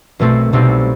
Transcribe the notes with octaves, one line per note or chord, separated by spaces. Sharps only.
B1 B2 A3 C4 F#4
C2 B2 A3 C4 D#4